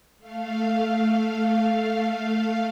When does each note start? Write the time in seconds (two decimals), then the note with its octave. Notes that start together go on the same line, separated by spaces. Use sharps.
0.18 A3 F5